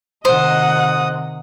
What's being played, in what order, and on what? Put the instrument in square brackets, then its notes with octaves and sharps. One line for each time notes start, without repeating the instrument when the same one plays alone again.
[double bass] C3 D#3 [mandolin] C5 [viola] D#5 F#5 [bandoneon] D#6